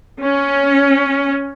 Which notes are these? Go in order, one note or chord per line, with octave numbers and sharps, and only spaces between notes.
C#4